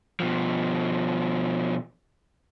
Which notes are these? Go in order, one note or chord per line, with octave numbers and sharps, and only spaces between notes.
B2 F3